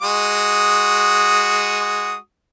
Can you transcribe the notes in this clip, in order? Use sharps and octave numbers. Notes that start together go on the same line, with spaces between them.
G#3 F#4 D#6